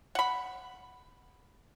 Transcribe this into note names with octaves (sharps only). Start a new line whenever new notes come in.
F#5 B5